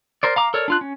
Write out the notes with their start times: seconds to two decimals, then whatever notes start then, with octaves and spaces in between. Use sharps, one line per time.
0.23 A#4 C5 D5
0.36 F5 A#5 D6
0.54 A4 A#4 C#5 D5
0.68 D4 F4 F#6
0.81 C#4